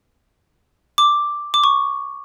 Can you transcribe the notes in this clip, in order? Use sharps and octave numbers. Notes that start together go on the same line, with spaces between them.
D6
D6
C#6